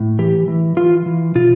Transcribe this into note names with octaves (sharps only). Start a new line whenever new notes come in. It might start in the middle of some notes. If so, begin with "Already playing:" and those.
Already playing: A2
E3 G4
E3
E3 F4
E3
B2 F4